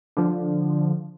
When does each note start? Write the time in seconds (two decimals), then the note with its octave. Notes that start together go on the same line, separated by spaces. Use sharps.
0.17 D3 F3